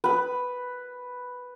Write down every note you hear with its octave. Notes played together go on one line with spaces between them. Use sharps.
B4 B5